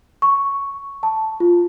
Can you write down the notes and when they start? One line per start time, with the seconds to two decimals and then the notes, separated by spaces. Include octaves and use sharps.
0.22 C#6
1.03 A5
1.40 F4